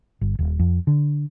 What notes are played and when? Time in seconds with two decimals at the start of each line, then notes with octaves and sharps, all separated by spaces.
0.21 G1
0.39 D#1
0.59 F2
0.87 D3